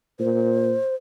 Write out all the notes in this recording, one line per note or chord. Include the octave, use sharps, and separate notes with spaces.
A#2 C5